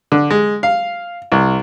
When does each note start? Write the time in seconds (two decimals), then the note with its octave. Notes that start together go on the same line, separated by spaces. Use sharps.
0.12 D3
0.31 G#3
0.63 F5
1.32 C2